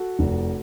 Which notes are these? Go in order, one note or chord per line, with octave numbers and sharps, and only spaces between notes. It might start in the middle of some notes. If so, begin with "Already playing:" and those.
Already playing: F#4 A4
F1